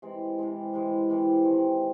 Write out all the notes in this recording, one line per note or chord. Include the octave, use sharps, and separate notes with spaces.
C3 E3 G#3
C3 E3 G#3
C3 E3 G#3
C3 E3 G#3
D#3 G#3 C4